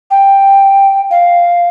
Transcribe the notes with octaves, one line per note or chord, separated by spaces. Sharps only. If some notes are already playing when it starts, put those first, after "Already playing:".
G5
F5